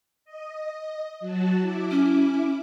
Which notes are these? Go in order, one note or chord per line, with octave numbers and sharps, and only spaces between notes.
D#5
F#3 F#4 A5
E4 D6
C#4